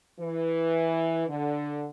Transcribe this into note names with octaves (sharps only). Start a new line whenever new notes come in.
E3
D3